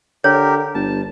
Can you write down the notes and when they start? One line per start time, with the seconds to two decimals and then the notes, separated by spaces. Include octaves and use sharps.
0.24 D3 G4 A#4 C#5
0.75 G1 A5